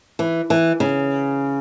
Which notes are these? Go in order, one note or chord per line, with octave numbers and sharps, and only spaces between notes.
E3
E3
C#3